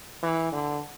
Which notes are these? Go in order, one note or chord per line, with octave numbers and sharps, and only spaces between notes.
E3
D3